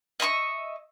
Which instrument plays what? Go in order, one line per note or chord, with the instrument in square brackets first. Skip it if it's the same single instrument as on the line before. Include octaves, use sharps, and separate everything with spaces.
[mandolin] D#5 E5 C6 C#6